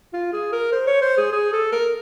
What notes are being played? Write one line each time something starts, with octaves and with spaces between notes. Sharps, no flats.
F4
G#4
A#4
C5
C#5
C5
G#4
G#4
A4
A#4